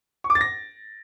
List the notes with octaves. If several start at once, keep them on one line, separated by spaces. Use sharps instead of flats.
C#6
D6
A6
A#6